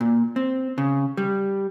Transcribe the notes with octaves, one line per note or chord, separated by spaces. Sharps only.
A#2
C4
C#3
G3